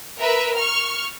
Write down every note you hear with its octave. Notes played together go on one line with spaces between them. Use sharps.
A#4 B4 E5
C#6 F6